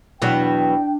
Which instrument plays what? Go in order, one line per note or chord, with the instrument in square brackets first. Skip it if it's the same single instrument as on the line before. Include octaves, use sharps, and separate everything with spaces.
[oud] E2 B2 F#3 [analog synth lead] D4 [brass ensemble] G5